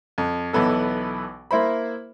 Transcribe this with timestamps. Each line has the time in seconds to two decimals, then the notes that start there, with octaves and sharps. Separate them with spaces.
0.18 F2
0.53 B1 E3 B3 A4
1.51 A#3 E4 C5 B5